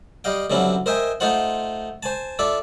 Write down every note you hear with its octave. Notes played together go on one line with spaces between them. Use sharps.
G3 D#5 F5 G5
D3 F#3 G3 C4 C#4 E4
A#4 C5 D#5 E5 G5 G#5
A3 D#4 F4 C5 F#5
C5 G#5 A5
F4 A4 D5 E5